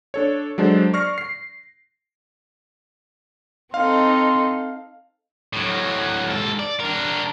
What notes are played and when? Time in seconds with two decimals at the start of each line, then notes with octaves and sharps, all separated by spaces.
0.14 D4 A4 C#5
0.58 F#3 G#3 D4 A4 C5
0.93 D5 C#6 F6 A#6 C7
1.18 C7
3.74 C4 D#4 A4 F5 C6
5.53 A2 F#3
6.30 G#2 A4
6.59 D5
6.80 D4 A#4